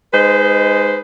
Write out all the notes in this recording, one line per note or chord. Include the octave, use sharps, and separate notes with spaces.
G#3 D#4 B4 C5